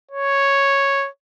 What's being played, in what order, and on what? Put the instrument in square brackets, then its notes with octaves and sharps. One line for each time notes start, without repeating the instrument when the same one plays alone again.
[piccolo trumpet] C#5